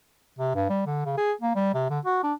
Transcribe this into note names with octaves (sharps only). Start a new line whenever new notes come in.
C3
G2
G3
D3
C#3
G#4
A#3
G3
C3
D3
F#4
D4